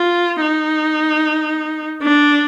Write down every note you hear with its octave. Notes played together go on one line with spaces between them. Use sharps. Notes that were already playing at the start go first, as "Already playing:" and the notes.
Already playing: F4
D#4
D4